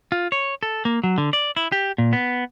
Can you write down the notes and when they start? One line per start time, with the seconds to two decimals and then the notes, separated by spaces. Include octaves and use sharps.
0.12 F4
0.32 C#5
0.63 A4
0.85 A#3
1.04 F#3
1.18 D3
1.33 D5
1.56 E4
1.72 G4
1.98 A#2
2.13 B3